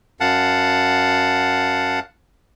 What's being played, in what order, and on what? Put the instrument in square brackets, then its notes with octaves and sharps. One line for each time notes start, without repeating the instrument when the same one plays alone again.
[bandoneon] F#2 F5 F#5 A5